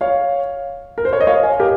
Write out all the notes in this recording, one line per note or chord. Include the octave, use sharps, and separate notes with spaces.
C#5 F5
A#4
C5
C#5
D#5
C#5 F5
F5 G#5
G4 A#4